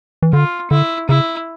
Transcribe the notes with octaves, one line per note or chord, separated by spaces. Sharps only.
E3
D3 F4
D3 E4
C#3 E4